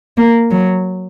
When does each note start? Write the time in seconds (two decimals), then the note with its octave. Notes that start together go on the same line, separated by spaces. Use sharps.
0.17 A#3
0.50 F#3